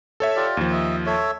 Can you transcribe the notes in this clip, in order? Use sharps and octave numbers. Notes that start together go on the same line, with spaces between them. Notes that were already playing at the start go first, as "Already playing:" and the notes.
A4 C#5 E5
F4 G4 D5
D#2 F3
D#5 E5
A4 C#5 E5